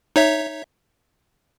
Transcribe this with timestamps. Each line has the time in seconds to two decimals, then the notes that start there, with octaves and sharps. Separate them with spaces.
0.16 D#4 C#5 E5